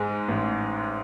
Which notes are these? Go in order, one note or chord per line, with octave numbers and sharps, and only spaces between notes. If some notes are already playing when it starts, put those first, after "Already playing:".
Already playing: G#2 G#3
A1